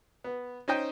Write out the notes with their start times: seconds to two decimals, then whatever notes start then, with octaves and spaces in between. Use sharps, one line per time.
0.24 B3
0.68 C#4 D#4 C5 D#5 G5